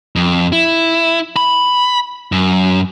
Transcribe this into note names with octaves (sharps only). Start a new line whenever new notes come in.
F2
E4
B5
F#2